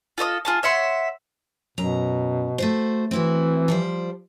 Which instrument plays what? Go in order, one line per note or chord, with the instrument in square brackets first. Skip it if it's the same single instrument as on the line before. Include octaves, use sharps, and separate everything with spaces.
[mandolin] F4 A4 D#5 D#6
F4 G#4 A5
C#5 E5 F#5 C6
[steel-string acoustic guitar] F#2 A#5 [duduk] B2
[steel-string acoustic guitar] A3 F#4 C5
[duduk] E3 [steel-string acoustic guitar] C4 E4 F#4
[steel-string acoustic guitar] F3 G3 C5